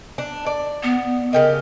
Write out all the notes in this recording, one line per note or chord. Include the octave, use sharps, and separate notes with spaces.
D4
D5
B3
C#3 G4 A#4 D#5